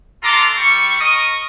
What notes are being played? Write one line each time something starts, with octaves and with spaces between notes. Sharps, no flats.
D4 F4 A4 A#5 C6 D6
G3 C#6
A#4 D#5 C#6 D#6